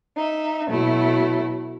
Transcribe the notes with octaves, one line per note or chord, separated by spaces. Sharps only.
D#4 E5
B2 F#3 A3 E4